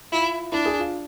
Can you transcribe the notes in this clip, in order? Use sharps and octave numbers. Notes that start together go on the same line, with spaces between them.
E4 F4
D4 E4
G#4
F4